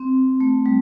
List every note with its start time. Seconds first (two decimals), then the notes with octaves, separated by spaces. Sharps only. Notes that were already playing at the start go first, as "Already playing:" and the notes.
Already playing: C4
0.40 A3
0.66 G3